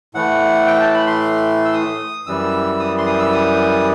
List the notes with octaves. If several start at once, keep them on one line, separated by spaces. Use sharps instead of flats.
A2 E3 A3 F#5
G5
A5
B5
C6
E6
D#6
F#2 E3 G3 E6
D#6
C6
D#6
E6
D#6